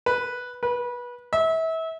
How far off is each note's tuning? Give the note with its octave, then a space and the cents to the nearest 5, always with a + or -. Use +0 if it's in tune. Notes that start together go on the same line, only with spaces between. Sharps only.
B4 -5
B4 -25
E5 -30